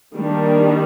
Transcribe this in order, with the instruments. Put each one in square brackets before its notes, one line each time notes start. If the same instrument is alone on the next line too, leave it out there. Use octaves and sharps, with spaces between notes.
[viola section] D#3 G3 A#3 D4